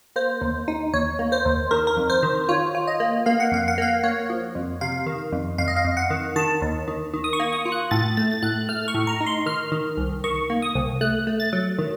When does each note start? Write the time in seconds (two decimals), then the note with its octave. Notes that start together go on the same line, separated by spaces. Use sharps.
0.16 A#3 C5
0.41 D#2
0.68 D#4
0.94 D#2 C#5
1.19 A#3
1.32 C5
1.45 D#2
1.71 D#3 A#4
1.87 A#4
1.97 F2
2.10 C5
2.23 D#3
2.49 F4 C#5
2.75 F4
2.87 D#5
3.00 A#3
3.26 A#3 F5
3.40 F#5
3.52 F2 F5
3.68 F#5
3.78 A#3 F5
4.04 A#3 C#5
4.30 F3
4.55 F2
4.81 C3 F5
5.06 D#3
5.32 F2
5.58 F2 F5
5.68 D#5
5.76 F5
5.85 F2
5.97 F#5
6.10 D#3
6.36 D#3 A5
6.62 D#2
6.88 D#3
7.14 D#3
7.24 D#6
7.33 C#6
7.40 A#3
7.53 D#6
7.65 F4
7.72 F#6
7.91 A2 A6
8.17 A3 A6
8.32 A6
8.43 A2 F#6
8.69 A3 F6
8.88 C#6
8.94 A2
9.07 A#5
9.21 D#4
9.26 C6
9.46 D#3 F6
9.72 D#3
9.97 C2
10.24 D#3 C#6
10.50 A#3
10.62 D#6
10.75 C2
11.01 A3 F#6
11.27 A3
11.40 A6
11.53 F#3
11.79 D#3